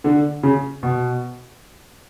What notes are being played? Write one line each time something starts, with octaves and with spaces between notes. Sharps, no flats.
D3
C#3
B2